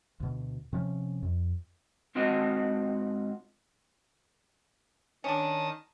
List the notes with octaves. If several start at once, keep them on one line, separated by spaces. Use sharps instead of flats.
D2 B2
C3 F3 C#4
F2
G#2 C4 F4 F#4 D#5
D#3 C#4 D4 A5 D#6